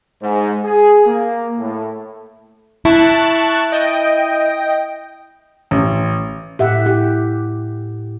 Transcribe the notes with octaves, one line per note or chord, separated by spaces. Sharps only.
G#2
G#4
A#3
A2
E4 A5 C#6 F#6
D#5 G5
A1
A2 G4 E5 F#5
G4